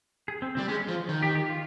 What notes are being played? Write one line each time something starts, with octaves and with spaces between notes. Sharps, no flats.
G#4
C4
C4
G3
G#3 C#4
F3
D#3
G4
G4
F4